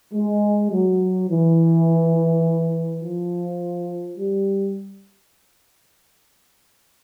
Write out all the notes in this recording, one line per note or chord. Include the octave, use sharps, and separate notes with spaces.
G#3
F#3
E3
F3
G3